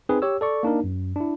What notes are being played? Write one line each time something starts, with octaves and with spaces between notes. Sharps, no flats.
C4 D#4 G#4 B4
G4 C#5 E6
A4 D5 C#6
A#3 D4 D#4 A#4
F#2
D4 E4